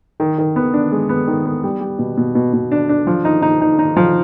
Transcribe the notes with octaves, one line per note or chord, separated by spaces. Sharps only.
D#3
D#3
B3
D4
G#3
B3
D#3
B3
G3
G3
B2
B2
B2
B2
D4
D4
F3
D#4
D#4
D#4
D#4
F3